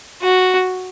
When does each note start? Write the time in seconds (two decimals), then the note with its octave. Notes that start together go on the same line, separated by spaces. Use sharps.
0.23 F#4